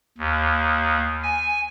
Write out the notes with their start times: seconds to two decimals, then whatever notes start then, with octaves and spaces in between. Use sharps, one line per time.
0.18 D#2
1.23 G#5